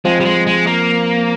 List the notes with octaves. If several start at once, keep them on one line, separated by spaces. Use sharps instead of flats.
F3 G#3 C4 F4
G3
G#3
G#3
A#3